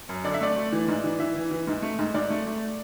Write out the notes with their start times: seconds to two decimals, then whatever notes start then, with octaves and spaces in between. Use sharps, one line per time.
0.09 F#2
0.24 D3 D5
0.34 E5
0.41 A3 D5
0.56 A3
0.72 E3
0.88 G#2
1.04 E3
1.19 E3 E5
1.36 E3
1.51 E3
1.67 G#2
1.82 A3
1.99 G#2
2.14 G#2 D5
2.30 A3
2.46 A3